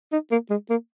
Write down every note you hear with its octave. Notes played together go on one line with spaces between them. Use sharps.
D#4
A#3
G#3
A#3